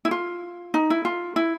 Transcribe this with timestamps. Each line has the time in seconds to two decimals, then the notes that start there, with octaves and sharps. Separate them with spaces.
0.05 E4
0.11 F4
0.74 D#4
0.90 E4
1.05 F4
1.36 E4